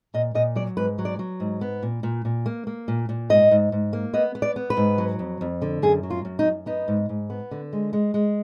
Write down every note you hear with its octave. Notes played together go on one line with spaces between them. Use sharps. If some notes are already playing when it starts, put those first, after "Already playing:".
A#2 D#5
A#2 D#5
F#3 D5
G#2 B4
F#3
D5
F#3
G#2
B3
A#2
A#2
A#2
A#3
A#3
A#2
A#2
G#2 D#5
G#2
G#2
A#3
B3 D#5
B3
D5
B3
B4
G#2
F#3
F2
F2
D3
F#2 G#4
F#3
F4
F#2
D#4
F#2
B3 D#4
G#2
G#2
B3
D3
G#3
G#3
G#3